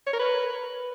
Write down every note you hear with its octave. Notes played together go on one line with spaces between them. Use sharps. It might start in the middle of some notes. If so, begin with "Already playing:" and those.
C#5
A#4
B4